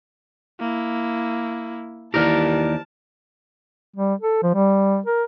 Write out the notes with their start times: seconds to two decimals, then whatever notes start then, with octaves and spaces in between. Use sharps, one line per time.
0.60 A#3 E4
2.14 D#2 E3 G4 A#4 C5 D5 A5 F6
3.96 G3
4.20 A4
4.43 F3
4.54 G3
5.06 A#4